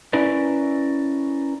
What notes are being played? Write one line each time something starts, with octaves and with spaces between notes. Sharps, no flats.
C#4 E4 A#4 B4 D5